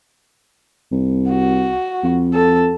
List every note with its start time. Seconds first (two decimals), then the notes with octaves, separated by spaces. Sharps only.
0.91 C2
1.30 F#4
2.03 F2
2.34 A4